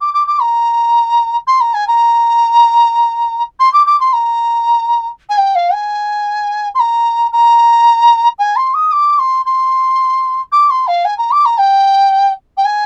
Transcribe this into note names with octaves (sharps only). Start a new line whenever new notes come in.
D6
D6
D6
A#5
C6
A#5
G#5
A#5
C6
D6
D6
C6
A#5
G#5
G5
F5
G#5
C6
A#5
A#5
G#5
C6
D#6
D6
C6
C6
D6
C6
F5
G#5
A#5
D6
A#5
G5
G5
G#5